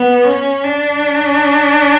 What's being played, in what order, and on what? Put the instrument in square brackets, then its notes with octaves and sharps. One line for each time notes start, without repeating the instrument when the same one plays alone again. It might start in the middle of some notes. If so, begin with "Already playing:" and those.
Already playing: [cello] B3
C#4
D4